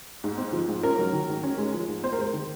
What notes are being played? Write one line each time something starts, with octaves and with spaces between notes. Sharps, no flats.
G#2
C4
F3
G#2
C#4 A#4
F#3
D#3
G#2
C#4
G#3
F3
G#2
C4 C5
A#4
G#3 C5
D#3